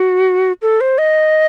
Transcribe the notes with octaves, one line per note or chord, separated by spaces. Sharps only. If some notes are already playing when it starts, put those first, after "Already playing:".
Already playing: F#4
A4
C5
D#5